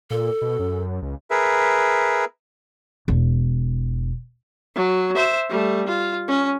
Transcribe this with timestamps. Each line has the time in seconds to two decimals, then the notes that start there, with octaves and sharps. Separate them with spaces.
0.10 A#2 A4
0.42 B2
0.59 F#2
1.02 C#2
1.31 G#4 A#4 B4 E5
3.08 E1
4.75 F#3
5.15 C5 E5
5.49 G3 A3
5.88 F4
6.28 C#4